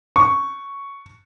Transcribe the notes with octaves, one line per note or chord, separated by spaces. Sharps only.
C#6